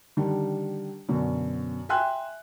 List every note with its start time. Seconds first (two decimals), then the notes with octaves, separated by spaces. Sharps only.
0.17 D3 D#3 G3 D4
1.08 F#2 B2 D3
1.89 E5 G5 G#5 C6 F#6